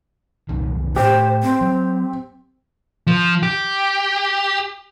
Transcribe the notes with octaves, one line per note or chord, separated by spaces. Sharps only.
C2 F#2 D#3
A2 G4 C5
C4
F#3
F3
G4